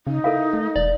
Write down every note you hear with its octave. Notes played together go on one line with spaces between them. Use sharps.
C#3 D#4
E4 A4 A#4 F5
A3
E1 D5